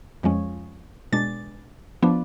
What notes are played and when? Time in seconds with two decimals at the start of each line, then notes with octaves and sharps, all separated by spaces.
0.23 F2 F3 G#3 C#4
1.12 B2 G#3 D4 A6
2.03 F3 B3 D4